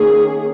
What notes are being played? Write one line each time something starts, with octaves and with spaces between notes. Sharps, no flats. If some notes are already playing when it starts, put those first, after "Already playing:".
Already playing: D#3 A#3 C#4 G#4